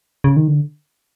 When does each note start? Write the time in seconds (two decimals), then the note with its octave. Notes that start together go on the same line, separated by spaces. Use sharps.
0.24 C#3
0.36 D#3
0.48 D3